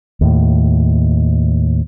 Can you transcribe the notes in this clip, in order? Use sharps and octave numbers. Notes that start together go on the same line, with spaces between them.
D#2 A2